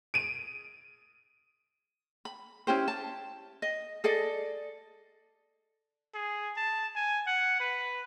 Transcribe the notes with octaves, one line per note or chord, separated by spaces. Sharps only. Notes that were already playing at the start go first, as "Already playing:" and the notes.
D7 D#7
B5
C#4 E4 G4 C5
A5
D#5
G#4 A4 D5 D#5
G#4
A5
G#5
F#5
B4